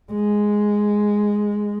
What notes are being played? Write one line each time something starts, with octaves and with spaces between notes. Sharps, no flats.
G#3